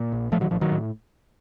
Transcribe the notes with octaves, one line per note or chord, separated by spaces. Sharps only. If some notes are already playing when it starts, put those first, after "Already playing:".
Already playing: A#2
A#1
A1 F3 A3
D#3 F#3
A1 F3
D#3 F#3
A2